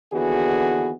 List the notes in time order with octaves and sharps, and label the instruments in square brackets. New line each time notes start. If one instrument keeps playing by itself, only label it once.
[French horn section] D#2 D3 E3 B3 F#4 G#4